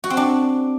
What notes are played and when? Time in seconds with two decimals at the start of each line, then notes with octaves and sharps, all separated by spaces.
0.04 F#4
0.10 C4
0.17 D4